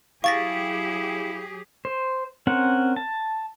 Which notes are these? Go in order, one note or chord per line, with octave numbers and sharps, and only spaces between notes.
F#3 E4 G4 G#4 F5 C#6 A6 A#6
C5
C4 C#4 A#4 F#5
A5